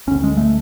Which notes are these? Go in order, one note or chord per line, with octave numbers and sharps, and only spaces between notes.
D2 D3 C#4
G#3
A3